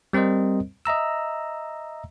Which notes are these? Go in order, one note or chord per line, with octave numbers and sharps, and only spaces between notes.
G3 C4 A#4 C5 D#5
D#5 E5 A#5 E6